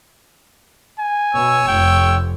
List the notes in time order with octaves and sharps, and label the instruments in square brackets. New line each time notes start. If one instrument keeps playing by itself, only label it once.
[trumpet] G#5
[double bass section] B2 [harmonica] C#5 E6
[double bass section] F1 [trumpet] G5